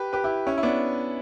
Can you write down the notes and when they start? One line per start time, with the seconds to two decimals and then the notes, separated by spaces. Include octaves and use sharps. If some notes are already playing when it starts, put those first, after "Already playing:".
Already playing: G4 B4
0.13 G4 B4
0.24 E4 G4
0.47 C#4 E4
0.58 E4
0.63 B3 D4